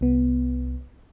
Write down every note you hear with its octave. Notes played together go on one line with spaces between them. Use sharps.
C2 B3